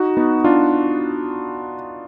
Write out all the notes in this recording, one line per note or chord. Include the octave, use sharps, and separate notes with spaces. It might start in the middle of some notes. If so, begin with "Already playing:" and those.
Already playing: D#4 F#4
B3 D#4
D4 F4